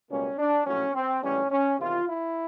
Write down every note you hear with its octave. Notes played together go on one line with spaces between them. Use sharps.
C#2 B2 G3 A#3 C#4
D4
A#1 A2 F#3 C#4
C4
A#1 A2 E3 G3 C#4
C#4
E2 C3 D#3 F4
E4